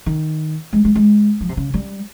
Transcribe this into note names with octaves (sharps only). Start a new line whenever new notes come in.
D#3
G#3
G#3
G#3
F3
C3
C#3
G3